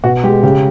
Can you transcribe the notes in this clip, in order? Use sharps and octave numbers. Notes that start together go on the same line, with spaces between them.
B2 F#4
G#3 G4
C#3 G4